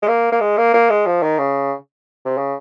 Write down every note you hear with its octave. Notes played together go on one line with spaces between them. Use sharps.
G#3
A#3
A#3
G#3
A#3
A#3
G#3
F3
D#3
C#3
C3
C#3